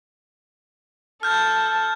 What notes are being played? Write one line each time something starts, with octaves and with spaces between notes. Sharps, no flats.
A4 F6 G6